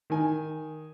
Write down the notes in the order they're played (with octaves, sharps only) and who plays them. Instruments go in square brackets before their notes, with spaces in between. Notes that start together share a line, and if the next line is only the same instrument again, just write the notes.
[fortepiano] D#3 G#5